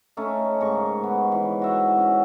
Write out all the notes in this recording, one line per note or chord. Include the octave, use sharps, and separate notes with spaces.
A3 C#4 D#4 A4
G#2 C#3 A#4 C#6
B3
E3
F#4 E5 F#5
C#4